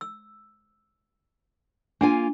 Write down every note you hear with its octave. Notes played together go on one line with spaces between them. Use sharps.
E6
A#3 D4 F4 G#5